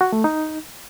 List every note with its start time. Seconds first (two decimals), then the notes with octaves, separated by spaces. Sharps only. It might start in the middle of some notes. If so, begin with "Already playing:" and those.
0.01 F#4
0.12 A3
0.24 D#4